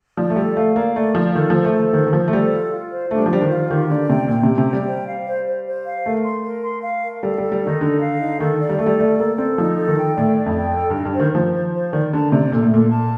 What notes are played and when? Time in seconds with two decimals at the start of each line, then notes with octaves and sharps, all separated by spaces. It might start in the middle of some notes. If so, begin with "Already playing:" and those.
0.17 F3 D5
0.30 A3
0.36 G3 A4
0.56 A3 F5
0.75 A#3 D5
0.96 A3 D5
1.15 F3 F4
1.34 D#3 A4
1.50 F3 C5
1.65 A3
1.74 A4
1.79 A3
1.93 D#3 C5
2.07 D#3
2.13 F3 C5
2.28 A3
2.33 G3 A4
2.52 F4
2.71 F4
2.91 C5
3.11 A3 D4
3.18 G3
3.26 F3
3.31 G3 C5
3.41 D#3
3.50 F4
3.69 D#3 G4
3.90 D3 D5
4.09 C3 G5
4.28 A#2 G5
4.43 C3 G4
4.58 C3
4.69 G3 G5
4.87 C5
5.08 F5
5.26 C5
5.47 C5
5.67 C5
5.86 F5
6.05 A3 A#4
6.25 C6
6.44 A#4
6.64 C6
6.83 F5
7.03 A#4
7.23 G3 A4
7.38 G3 A4
7.52 G3
7.63 D#3 D#4
7.81 D3 A4
8.01 F5
8.20 D#4
8.40 D#3 A4
8.60 D5
8.69 G3
8.78 A3 A4
8.86 G3
8.99 A3 D5
9.18 A#3 A4
9.38 C4 A4
9.58 F3 D#4
9.77 A4
9.88 D#3
9.98 G5
10.17 A2 D5
10.36 D5
10.46 F2
10.56 G5
10.75 A4
10.90 G2
10.96 D#4
11.05 G2
11.15 D#3 C5
11.34 F3 C5
11.55 C5
11.74 C5
11.93 D#3 D5
12.13 D3 A5
12.32 C3 D5
12.52 A#2 A4
12.63 A2
12.71 A#2 A4
12.91 A5